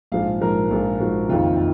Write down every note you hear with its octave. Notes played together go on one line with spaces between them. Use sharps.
A#1 G#2 F3 F5
A#1 G#2 F3 A#4
A#1 G#2 F3
A#1 G#2 F3 F#4
F#1 F2 D#3 F4